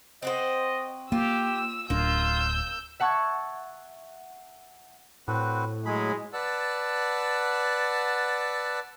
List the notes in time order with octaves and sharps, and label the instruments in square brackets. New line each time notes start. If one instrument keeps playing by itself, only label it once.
[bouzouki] C4 F#4 C5 [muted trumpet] D#5
[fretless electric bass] A#3 [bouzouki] F4 [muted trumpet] G4 [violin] E6
[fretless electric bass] D1 D4 [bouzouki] A#3 [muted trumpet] F4 [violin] E6 G6
[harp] E5 F#5 A5 C#6 G#6
[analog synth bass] A2 [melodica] C4 F#4 B4
[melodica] F#3 G#4 B5 [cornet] G#3
[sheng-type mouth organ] B4 D5 F#5 A5 E6